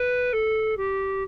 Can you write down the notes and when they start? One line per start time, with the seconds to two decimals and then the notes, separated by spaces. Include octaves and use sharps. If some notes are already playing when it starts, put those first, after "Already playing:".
Already playing: B4
0.33 A4
0.77 G4